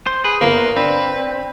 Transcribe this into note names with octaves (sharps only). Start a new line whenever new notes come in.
C5
G#4 B4
G1 A#3 B3
C4 D4 B4